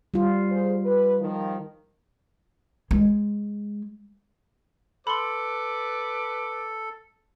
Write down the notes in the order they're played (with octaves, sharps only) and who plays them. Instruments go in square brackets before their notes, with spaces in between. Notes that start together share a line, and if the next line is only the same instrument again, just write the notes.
[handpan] G3 F4
[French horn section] G#4 C5
B4
D#3 F3
[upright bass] G#3
[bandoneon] A4 [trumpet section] B4 D6 [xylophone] B5 C6